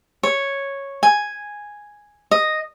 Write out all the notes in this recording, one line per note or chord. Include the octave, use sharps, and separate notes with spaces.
C#5
G#5
D#5